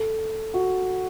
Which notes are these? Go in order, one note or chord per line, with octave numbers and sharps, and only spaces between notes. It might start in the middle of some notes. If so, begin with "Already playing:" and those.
Already playing: A4
F#4